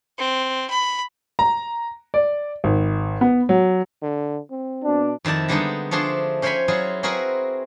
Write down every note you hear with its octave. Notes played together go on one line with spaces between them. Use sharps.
C4
B5
A#5
D5
G#1
B3
F#3
D3
C4
B2 D4
F2 D#3 E4 D5 A5
D3 G3 G#3 B3 D4 D#4
F3 A3 D4 G#4 C6
C#4 C5 C#5 G5 G#5 B5
F#3 E4 F4 G#4
C4 F#4 G#4 A#4 B4